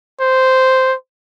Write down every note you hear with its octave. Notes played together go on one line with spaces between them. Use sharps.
C5